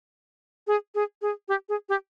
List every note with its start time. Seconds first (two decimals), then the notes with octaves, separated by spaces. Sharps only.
0.67 G#4
0.95 G#4
1.22 G#4
1.48 G4
1.69 G#4
1.89 G4